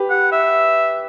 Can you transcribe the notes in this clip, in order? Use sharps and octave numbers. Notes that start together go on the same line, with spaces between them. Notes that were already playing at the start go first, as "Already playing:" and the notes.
Already playing: G4 B4
F#5
E5